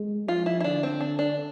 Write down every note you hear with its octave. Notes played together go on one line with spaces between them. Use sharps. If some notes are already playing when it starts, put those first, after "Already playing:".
Already playing: G#3
F3 F4
E4
E4
D3 D4
C4
D4
D4